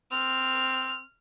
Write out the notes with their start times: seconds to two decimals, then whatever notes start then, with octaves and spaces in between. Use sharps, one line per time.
0.12 C4 F6